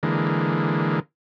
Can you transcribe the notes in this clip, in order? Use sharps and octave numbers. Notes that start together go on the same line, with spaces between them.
D3 E3 G#3 A#3